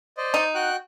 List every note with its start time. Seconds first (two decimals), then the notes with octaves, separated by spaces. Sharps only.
0.17 C5 D5 D#5
0.34 D#4
0.55 F#4 G5 F#6